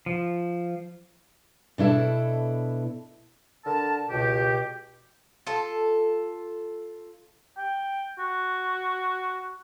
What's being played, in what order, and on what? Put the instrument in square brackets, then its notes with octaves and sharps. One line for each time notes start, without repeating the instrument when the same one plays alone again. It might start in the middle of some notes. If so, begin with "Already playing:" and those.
[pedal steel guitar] F3
[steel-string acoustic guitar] B2 D4 E4 A4
[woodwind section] D3 A#4 A5
C#2 B2 G4
[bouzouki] F4 A4
[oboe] G5
F#4